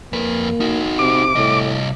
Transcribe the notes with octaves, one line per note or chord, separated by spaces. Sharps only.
F2 A#3 B4
D#4 F#4
C3 D6
C2 A2 D#5